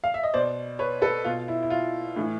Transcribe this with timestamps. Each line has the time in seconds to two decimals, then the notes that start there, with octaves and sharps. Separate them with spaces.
0.04 F5
0.14 E5
0.23 D#5
0.34 B2 C5 D5
0.79 B4 C#5
1.02 A4 B4
1.25 B2 F4
1.48 E4
1.63 E4
1.70 F4
2.16 A2 E3